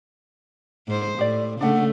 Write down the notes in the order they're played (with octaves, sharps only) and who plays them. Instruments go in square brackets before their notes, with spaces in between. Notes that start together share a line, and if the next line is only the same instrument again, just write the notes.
[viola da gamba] G#2 C5
[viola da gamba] A2 [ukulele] G4 D5
[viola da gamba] C#3 A3 [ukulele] D4 F#5